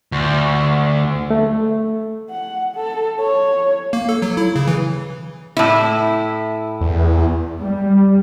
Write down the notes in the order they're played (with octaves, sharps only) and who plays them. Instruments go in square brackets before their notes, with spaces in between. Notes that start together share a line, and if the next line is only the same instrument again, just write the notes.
[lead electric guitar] D2
[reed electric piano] A3
[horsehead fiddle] F#5
A4
C#5
[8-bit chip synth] A#3
A4
F#3
E4
C#3
E3
[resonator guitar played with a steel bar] A2 E4
[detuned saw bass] E2
[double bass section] G3